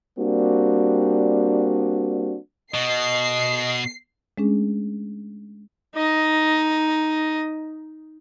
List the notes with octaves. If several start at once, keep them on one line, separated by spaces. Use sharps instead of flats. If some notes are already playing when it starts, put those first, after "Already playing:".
G3 A#3 C4 D4 F#4
B2 D#5 C7
G#3 A3 C#4 D4 G#4
D#4 D#5